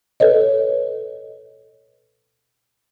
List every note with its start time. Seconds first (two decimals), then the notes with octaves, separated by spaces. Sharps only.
0.20 A4 B4 C#5 D#5